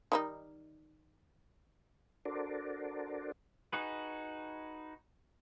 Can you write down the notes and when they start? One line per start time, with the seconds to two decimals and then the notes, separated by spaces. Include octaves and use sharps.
0.12 D#3 G3 D#4
2.25 D4 F#4 A4 A#4 C5 D5
3.72 D#4 F#4 G#4 B4